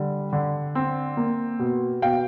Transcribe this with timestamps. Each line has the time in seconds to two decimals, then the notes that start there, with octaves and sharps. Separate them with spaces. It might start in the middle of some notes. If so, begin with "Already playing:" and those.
Already playing: D3 G3
0.33 D3
0.75 C4
1.17 A#3
1.59 B2
2.02 B2 F5 G5